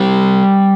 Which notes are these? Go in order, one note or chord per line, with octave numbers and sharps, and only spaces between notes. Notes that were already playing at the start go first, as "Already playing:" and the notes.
Already playing: G3 C4